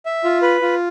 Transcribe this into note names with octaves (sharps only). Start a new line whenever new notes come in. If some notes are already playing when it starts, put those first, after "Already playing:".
E5
F4
B4
F4